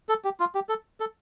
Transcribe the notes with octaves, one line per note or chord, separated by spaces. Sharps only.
A4
G4
F4
G4
A4
A4